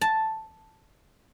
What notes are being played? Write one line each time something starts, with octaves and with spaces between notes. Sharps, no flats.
A5